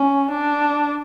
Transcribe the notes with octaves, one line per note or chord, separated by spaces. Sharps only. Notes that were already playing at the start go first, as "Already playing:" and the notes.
Already playing: C#4
D4